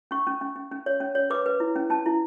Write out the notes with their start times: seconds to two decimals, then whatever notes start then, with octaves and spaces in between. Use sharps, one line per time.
0.11 C#4 C#6
0.27 C#4
0.41 C#4
0.56 C#4
0.71 C#4
0.86 C#5
1.00 C#4
1.15 C#5
1.30 B4 D6
1.46 B4
1.60 E4
1.76 C#4
1.90 C#4 A5
2.06 E4